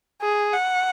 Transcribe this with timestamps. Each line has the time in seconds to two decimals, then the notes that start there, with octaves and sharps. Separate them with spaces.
0.22 G#4
0.54 F#5